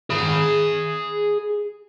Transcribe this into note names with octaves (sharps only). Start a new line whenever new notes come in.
G#4 B5